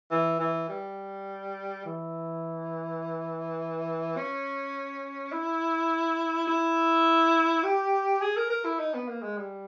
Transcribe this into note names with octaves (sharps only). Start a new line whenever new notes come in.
E3
E3
G3
E3
C#4
E4
E4
G4
G#4
A#4
A#4
E4
D#4
B3
A#3
G#3
G3